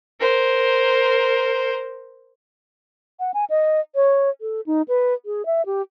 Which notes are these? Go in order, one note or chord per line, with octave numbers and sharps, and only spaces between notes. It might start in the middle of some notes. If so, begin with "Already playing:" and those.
A#4 C5
F#5
G#5
D#5
C#5
A4
D#4
B4
G#4
E5
G4